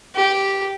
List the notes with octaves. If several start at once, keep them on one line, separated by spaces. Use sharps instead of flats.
G4